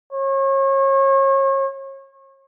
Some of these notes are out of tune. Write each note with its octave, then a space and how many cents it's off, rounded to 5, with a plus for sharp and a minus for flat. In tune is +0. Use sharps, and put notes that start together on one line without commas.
C#5 -35